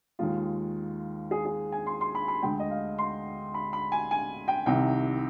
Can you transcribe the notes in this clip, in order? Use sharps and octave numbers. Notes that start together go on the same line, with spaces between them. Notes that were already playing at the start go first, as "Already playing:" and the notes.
D#2 D#3 G#3 F4
G#4
G#4
G#5
C6
C6
B5
B5
D2 D3 G#3 G5
D#5
F5
C6
B5
B5
G#5
G#5
G5
C2 C3 D#3 G5